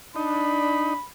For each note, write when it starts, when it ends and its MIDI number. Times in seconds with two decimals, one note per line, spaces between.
0.16 0.94 62
0.16 0.94 63
0.16 1.07 83